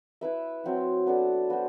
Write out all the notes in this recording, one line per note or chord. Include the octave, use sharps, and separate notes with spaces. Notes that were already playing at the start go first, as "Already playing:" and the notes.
E4 B4 E5
F#3 C4 E4
B3 D4 A4
B3 F#4 C5